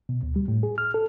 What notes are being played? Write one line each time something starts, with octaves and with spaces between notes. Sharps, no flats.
B2
D2
G3
A2
G#4
F6
A4